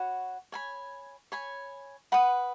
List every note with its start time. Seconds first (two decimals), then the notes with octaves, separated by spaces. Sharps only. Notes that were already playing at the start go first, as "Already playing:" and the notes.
Already playing: F#4 C#5 F#5 B5
0.52 C#5 G#5 B5
1.32 C#5 G#5 B5
2.12 B4 F#5 B5 D#6